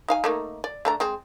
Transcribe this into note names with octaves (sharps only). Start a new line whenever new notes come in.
D#4 F5 G#5
A3 A#3 D#4
D5
A3 D4 A#5
G#3 C4